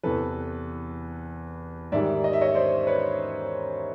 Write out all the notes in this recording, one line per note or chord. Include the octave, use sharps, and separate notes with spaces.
E2 C3 E3 A4 B4
G#2 D#3 G3 D5 E5
D#5
E5
C#5 D#5
C5 D5
B4 C#5